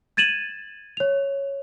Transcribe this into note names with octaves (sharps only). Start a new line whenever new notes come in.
G#6 A6 D#7 E7 F#7
C#5 F7